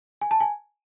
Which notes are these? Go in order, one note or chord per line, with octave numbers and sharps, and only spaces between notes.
G#5
A5
G#5